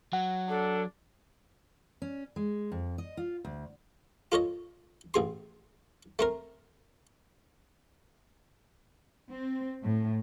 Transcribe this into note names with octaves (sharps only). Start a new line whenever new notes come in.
F#3 F#5
D4 A4
C#4
G#3
F2
D#5
F4
D2
F4 A4 C#5 D#5
A1 G#4 C6
A3 C4 A#4
C4
A2